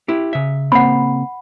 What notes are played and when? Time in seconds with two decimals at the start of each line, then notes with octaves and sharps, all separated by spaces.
0.08 E4 G4
0.33 C#3 E5
0.72 C#3 A#3 C4 F#5 B5